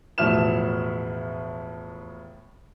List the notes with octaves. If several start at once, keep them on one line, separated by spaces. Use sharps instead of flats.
E1 A2 F3 E5 F6 E7